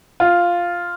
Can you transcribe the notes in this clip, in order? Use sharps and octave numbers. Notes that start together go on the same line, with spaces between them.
F4